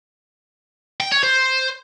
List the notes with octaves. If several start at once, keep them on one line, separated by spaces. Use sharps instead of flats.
G5
C#5
C5